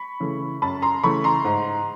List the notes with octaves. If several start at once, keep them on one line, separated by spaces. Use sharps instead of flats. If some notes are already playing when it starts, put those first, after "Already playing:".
Already playing: B5 C#6
C#3 E3 A3
F#2 A5 B5
A#5 C6
C#3 E3 A3 B5 C#6
A#5 C6
G#2